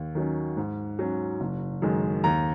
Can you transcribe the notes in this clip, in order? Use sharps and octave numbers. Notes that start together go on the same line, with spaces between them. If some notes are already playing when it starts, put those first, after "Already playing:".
Already playing: D#2
D#3 F#3 C#4
G#2
F#3 C#4
F#1
F#2 D#3 G#3
D#2 A#5